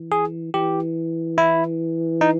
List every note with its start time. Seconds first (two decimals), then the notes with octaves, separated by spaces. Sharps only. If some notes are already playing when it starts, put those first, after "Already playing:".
Already playing: E3
0.12 G#4
0.54 E3 G4
1.38 E4
2.21 D#4